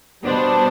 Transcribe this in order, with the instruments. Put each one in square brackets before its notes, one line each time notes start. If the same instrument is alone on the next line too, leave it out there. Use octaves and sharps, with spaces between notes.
[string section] B2 G3 B3 D4 C5